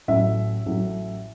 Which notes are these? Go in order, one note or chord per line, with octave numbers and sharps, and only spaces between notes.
A1 A2 F#3 E5
A1 A2 F#3